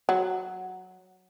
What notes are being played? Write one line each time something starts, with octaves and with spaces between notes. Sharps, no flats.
F#3